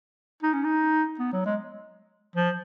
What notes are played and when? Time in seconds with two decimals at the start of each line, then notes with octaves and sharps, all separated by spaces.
0.43 D#4
0.53 C#4
0.64 D#4
1.19 B3
1.33 F#3
1.46 G#3
2.36 F3